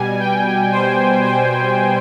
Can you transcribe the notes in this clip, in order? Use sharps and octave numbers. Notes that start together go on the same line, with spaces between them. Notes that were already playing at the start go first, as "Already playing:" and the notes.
Already playing: B2 G3 G#5
G5
C5
C5